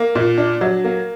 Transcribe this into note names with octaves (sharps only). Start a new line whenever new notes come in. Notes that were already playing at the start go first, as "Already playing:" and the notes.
Already playing: A#3
A#2
D4
F#3
A#3